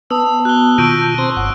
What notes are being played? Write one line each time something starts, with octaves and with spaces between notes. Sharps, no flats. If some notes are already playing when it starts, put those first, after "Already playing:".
B3 B4 A5 D#6 E6
F#4 F#6 G7
B2 D#3 F4 C#6 E6 G6 D7
C4 C5 A#5 C6
F#1 G2 F#5